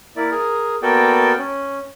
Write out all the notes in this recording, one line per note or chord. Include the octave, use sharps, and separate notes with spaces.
A#3 E4 D5
G#4 A#4
A#3 B3 F#4 A4 D5 G5
C#4